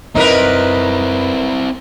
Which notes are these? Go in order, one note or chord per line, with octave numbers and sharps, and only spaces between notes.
F#2 C4 D#4 E4 A#4 B4